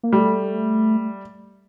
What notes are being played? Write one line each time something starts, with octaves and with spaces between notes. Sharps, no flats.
A#3
G3 A3